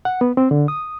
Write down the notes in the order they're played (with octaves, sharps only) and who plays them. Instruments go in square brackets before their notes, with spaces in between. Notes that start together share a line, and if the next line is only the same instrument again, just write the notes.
[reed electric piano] F#5
B3
C4
D3
D#6